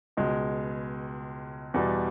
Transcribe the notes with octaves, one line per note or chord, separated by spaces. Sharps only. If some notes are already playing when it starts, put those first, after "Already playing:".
C#2 B2 G#3
E2 B2 G3